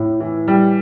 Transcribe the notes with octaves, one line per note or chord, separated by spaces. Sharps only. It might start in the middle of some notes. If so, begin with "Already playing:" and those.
Already playing: A2
E3
G3